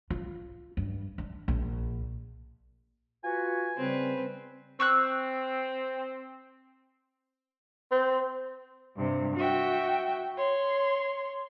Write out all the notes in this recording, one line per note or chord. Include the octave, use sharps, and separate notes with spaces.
F4
G2
D4
A#1
F4 F#4 B4 G#5
C#3 G3 C4 B4
C4 C#6 E6 F#6
C4
G2 C3
F#4 E5 G5
C#5 C6